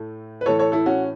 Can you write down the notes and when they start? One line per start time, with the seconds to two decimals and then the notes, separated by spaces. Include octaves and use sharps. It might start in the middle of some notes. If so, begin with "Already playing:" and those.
Already playing: A2 A3
0.41 B4
0.46 A2 E3 A3 A4 C#5
0.59 A4 C#5
0.72 E4 A4
0.86 C#4 F#4